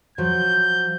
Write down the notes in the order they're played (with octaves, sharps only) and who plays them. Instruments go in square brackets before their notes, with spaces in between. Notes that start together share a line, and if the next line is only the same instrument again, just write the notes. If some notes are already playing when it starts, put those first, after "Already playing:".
[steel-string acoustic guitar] F3 F#3 F#4 [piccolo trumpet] G6